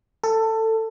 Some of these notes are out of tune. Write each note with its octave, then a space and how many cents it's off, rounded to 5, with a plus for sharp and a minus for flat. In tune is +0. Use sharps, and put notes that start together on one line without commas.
A4 +20